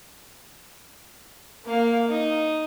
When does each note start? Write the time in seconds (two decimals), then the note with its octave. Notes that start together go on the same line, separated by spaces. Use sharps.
1.65 A#3 F5
2.09 D#4